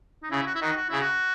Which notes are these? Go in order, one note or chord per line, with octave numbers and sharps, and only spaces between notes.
D#4
C#3 E4
F#4
E4
D#3 F#4
F#4
C#3 E4
F#4